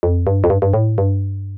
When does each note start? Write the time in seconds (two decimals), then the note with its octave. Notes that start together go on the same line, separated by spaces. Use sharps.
0.03 F2
0.27 G2
0.44 F2
0.50 G2
0.62 G2
0.74 A2
0.98 G2